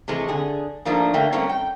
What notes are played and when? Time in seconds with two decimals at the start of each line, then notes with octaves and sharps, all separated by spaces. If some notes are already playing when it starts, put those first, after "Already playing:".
0.08 C3 E3 G#3 A3
0.28 D3 G#4
0.85 G#2 F3 A3 A#3 D4
1.14 D3 A3 A#3 E5 G5
1.32 G3 A3 A#3 C4 C#4 F#4
1.49 G5